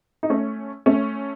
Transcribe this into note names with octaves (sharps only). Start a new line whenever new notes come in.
D#4
A3 C#4
A3 C#4